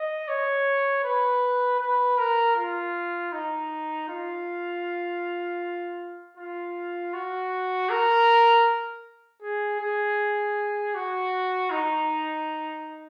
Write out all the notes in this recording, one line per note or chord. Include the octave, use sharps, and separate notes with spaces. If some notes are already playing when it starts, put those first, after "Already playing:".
Already playing: D#5
C#5
B4
B4
A#4
F4
D#4
F4
F4
F#4
A#4
G#4
G#4
F#4
D#4